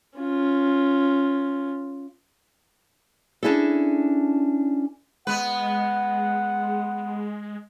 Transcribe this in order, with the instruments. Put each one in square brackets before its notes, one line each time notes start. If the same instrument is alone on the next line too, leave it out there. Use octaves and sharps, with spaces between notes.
[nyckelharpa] C#4 F4
[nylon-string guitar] C#4 D4 E4 G#4 A4
[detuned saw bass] G#3 [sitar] B3 B4 [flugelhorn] F#5